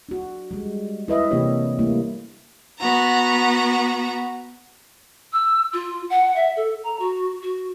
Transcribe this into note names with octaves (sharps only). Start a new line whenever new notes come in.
D4 F#4
G3 G#3
E4 B4 D#5 E5
C3 E3 A#3 D4 G4 C#5
G3 A3 A#3 E4
B3 F#4 A#5
E6
F4
F#5
E5
A4
A#5
F#4
F#4